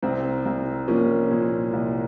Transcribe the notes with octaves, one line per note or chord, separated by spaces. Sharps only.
C2 C4
C2
F3 A#3 C#4
A#2
C2